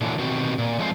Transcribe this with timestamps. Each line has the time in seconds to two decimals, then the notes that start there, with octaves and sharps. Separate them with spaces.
0.01 A#2 D3 E3 F#3
0.18 B2 D#3 C4 F#4 G4
0.58 A#2
0.79 F3 G#3 A3 C4 A4 C5